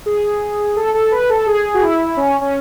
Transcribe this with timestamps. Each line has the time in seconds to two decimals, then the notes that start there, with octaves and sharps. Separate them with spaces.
0.06 G#4
0.76 A4
0.94 A4
1.12 B4
1.29 A4
1.47 G#4
1.74 F#4
1.82 E4
2.17 C#4
2.41 C#4